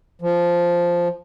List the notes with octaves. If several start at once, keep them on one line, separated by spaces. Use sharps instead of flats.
F3